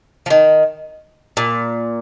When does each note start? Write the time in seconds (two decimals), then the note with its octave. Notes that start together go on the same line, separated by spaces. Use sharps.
0.26 F3
0.30 D#3
1.37 A#2